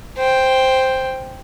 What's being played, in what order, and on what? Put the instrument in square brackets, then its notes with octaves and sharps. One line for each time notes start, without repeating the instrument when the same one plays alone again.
[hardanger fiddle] C5 G5